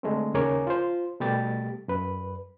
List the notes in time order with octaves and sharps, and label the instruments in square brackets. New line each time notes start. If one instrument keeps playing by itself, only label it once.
[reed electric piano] D3 G#3 A3 C4
D#2 C#3 A#4 C#5 G#5 D6
F4 C5
B2 G3 A3 G4 A6
F#2 B4